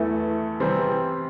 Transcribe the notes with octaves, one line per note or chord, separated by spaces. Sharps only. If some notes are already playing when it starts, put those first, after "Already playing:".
Already playing: E2 E3 A3 E4 A4
C3 E3 G3 C4